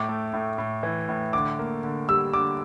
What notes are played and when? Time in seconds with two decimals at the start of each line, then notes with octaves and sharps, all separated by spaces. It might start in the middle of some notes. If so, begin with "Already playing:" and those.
Already playing: A2 D6
0.09 A3
0.33 A2
0.58 A2
0.83 E3
1.09 A2
1.33 D3 D6
1.59 A#3
1.84 D3
2.09 G3 E6
2.33 D3 D6